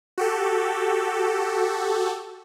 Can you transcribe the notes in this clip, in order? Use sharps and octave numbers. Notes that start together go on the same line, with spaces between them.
F#4 G4 A4